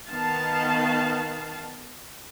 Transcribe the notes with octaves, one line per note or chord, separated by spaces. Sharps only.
D#3 B3 F5 A5